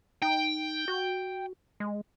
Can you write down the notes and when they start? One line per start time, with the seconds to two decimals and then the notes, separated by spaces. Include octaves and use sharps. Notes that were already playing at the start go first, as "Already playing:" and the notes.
0.22 D#4 G5
0.88 F#4
1.80 G#3